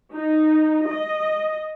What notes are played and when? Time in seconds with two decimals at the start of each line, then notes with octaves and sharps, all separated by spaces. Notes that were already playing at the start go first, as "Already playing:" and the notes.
0.13 D#4
0.88 D#5